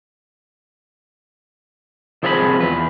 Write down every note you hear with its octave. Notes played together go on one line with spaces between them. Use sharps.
C2 F3 C4 G#4 E5 B5
E2 B4